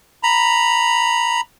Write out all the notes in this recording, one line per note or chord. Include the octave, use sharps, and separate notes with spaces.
A#5 B5